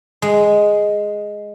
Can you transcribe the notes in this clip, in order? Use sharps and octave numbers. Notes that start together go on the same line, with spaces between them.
G#3